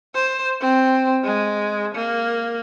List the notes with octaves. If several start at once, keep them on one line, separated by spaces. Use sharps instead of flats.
C5
C4
G#3
A#3